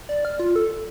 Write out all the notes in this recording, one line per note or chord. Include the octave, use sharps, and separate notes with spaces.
D5
F6
F4
A4